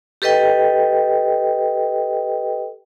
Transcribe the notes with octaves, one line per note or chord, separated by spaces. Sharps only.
G4 A4 B4 D#5 G5